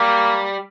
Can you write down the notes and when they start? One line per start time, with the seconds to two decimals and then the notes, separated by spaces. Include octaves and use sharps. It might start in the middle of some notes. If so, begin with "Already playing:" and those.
Already playing: G3 A#3